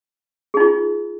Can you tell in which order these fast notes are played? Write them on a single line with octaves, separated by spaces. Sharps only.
G#4 D#4 F4